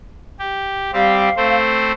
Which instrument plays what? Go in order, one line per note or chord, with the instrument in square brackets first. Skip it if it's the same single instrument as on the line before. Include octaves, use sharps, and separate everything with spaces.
[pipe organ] G4
[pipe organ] G3 C4 G4 [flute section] F5
[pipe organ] A3 C4 C5